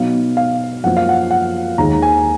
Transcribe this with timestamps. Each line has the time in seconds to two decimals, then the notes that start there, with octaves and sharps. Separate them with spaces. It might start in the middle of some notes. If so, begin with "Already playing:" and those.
Already playing: B2 F#3 B3 D#4 F5
0.37 F5
0.84 F#2 F3 A#3 F#5
0.97 F5
1.09 F#5
1.31 F#5
1.78 D#2 D#3 G#3 A#5
2.02 G#5